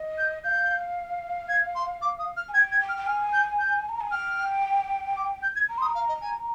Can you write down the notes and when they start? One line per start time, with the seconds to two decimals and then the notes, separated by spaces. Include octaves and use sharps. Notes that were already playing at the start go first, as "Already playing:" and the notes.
Already playing: D#5
0.18 G6
0.44 F5 G6
1.49 G#6
1.75 C6
2.02 D6
2.19 D#6
2.37 F6
2.49 G#5
2.54 G5 G#6
2.72 G#6
2.80 G5
2.89 F6
2.97 G5
3.06 G#5 F6
3.33 G6
3.59 G6
3.89 A#5
4.01 G#5
4.12 G5 F6
5.17 D6
5.43 G6
5.56 G#6
5.69 A#5
5.78 C6
5.82 D#6
5.86 A#5
5.95 F5
6.09 D#5
6.21 G#5